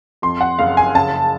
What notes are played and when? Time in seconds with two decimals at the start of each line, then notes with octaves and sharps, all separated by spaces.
0.22 F2 C6
0.41 F#5
0.59 F#1 F5
0.77 G#5
0.95 C#3 A5